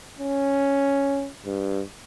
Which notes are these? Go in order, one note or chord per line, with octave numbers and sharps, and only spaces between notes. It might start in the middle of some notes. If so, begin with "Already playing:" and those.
C#4
G2